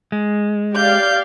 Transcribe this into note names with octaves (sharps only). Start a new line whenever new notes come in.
G#3
G4 D5 F5 G6